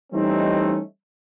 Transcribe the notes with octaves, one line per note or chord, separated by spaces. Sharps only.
E3 G3 A3 C4 C#4 D#4